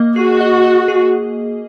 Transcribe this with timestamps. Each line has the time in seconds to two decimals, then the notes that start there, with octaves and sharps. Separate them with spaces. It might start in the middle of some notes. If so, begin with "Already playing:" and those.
Already playing: A#3 D#5
0.16 F#4 G#4
0.41 D#5
0.64 D#5
0.88 G#4